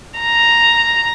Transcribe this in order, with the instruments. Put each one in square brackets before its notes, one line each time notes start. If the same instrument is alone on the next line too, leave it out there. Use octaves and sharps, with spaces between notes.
[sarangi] A#5